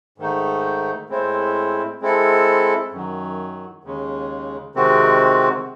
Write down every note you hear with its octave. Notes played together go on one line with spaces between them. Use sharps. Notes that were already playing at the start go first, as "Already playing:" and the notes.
G#2 D#3 A3 D#4
A2 G#3 C4 E4 C5
G#3 C4 E4 A4
F#2 D#3 F#3
D#2 C#3 G#3
C3 D#3 G#3 C4 F#4